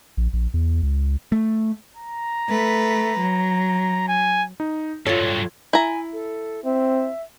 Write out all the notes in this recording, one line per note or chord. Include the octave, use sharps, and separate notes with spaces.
A#1
A#1
E2
C#2
A3
A#5
A3 B4
F#3
G#5
D#4
G2 F#3 F4 A4 C#5
E4 G#5 A#5
A4
C4 E5